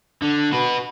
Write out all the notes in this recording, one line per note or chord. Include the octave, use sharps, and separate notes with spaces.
D3
F#4 B4